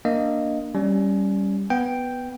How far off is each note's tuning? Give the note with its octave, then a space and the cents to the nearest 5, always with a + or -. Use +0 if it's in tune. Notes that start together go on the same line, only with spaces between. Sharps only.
A#3 +0 D4 +0 D#5 +0
G3 +0 C#4 +0 G#5 +30
B3 +0 G5 +0